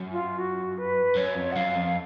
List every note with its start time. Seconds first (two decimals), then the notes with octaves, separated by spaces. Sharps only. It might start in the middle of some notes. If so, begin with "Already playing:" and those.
Already playing: F#2
0.12 F4
0.38 F#4
0.77 B4
1.17 F#2 C#5
1.36 F2
1.52 F#5
1.56 F#2 F5
1.75 F2